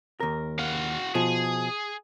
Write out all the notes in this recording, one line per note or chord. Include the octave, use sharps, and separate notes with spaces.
D#2 A#4
F#4 F5
B2 F3 G#4